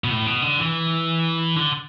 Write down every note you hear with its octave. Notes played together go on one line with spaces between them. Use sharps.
B2
A2
B2
D3
E3
D3